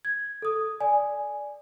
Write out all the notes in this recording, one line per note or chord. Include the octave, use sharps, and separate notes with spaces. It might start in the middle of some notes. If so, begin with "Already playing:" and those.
G#6
A4 D#6
D5 G#5